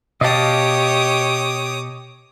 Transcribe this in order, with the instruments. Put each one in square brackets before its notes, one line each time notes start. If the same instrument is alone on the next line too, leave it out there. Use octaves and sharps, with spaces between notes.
[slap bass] B2 [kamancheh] G4 C#5 [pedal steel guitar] D#5 F5 A5 [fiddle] D6 D#6